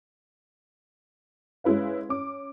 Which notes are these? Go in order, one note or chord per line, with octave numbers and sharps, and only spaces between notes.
G#3 C#4 E4 B4 F5
C#4 D6